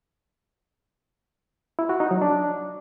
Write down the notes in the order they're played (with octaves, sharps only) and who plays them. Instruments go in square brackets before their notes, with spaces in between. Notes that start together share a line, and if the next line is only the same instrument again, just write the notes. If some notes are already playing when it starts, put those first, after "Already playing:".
[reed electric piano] E4
F#4
D#4
F#3
D4